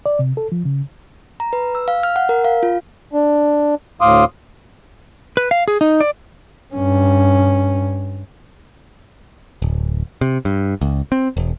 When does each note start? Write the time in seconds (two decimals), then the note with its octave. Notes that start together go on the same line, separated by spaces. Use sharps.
0.06 D5
0.19 C3
0.37 A4
0.52 F3
0.65 C#3
1.40 A#5
1.53 B4
1.75 E6
1.88 F5
2.03 F6
2.16 F#5
2.29 A#4
2.45 F5
2.63 F4
3.13 D4
4.01 D2 A2 F5 C6 D6 D#6
5.37 B4
5.51 F5
5.68 G#4
5.81 D#4
6.00 D5
6.74 G2 C#4
9.62 D1
10.21 C3
10.45 G2
10.81 C#2
11.12 C4
11.37 E1